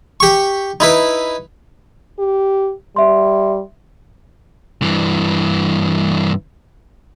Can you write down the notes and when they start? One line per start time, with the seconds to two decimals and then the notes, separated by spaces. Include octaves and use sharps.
0.20 G4 C#6
0.80 D#4 E4 B4
2.19 G4
2.96 G3 E5 C6
4.82 G2 E3